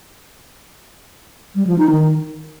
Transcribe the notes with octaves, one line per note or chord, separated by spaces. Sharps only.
G3
F3
D#4
D#3